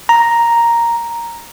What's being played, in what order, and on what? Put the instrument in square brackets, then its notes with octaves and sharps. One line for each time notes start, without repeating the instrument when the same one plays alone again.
[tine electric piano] A#5